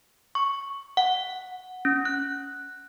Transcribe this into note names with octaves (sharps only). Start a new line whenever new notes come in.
C#6
F#5
C#4
F#6